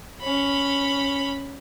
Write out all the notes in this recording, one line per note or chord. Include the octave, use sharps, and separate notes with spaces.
C#4 B5